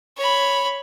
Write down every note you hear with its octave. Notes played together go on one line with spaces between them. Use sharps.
C#5 B5